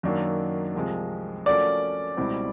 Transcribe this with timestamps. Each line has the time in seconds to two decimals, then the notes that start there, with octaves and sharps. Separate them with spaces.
0.03 F#2 D#3 F#3 A#3 D4
0.75 C2 C3 F3 G#3
1.46 F3 A3 C#4 F#4 A#4 D5
2.17 C#2 B2 G3 C4 E4